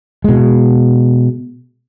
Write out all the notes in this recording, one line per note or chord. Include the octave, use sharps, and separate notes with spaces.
B2 G#3